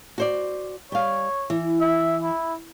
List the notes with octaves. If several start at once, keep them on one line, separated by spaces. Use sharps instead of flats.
F#4 C5 D5
G3 C#5 F5
E3
E5
E4